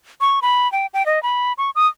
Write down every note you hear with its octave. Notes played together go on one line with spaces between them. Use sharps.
C#6
B5
G5
G5
D#5
B5
C#6
D#6